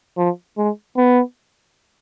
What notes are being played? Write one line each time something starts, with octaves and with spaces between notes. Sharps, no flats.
F3
G#3
B3